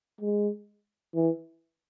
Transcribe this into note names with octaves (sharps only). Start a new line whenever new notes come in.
G#3
E3